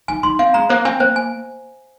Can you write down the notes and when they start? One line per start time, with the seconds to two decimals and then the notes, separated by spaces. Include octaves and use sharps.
0.08 D#4 G#5
0.23 D#4 C6
0.39 C4 F5
0.54 G#3 A#5
0.69 A#3 C5
0.85 C4 G#5
1.00 A#3 C5
1.16 G#5